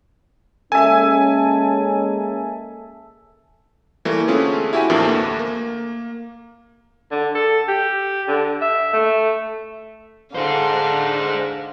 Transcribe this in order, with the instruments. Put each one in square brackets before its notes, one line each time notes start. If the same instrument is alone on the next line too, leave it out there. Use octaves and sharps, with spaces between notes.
[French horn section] G#3 A#3 C#4 [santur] A4 E5 [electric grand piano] G#5
[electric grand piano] E3 G3 A3 A#3
D3 A3 C4 C#4 F4 G#4
E4 F#4 G4 E5 G#5
F2 A2 E3 F3 A#3 D4
D2 A3
A#3
[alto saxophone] D3
A4
G4
D3
E5
A3
[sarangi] D3 [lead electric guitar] G#4 C5 [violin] F5